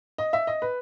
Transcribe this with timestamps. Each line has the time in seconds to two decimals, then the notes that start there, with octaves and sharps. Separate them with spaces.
0.18 D#5
0.33 E5
0.47 D#5
0.62 B4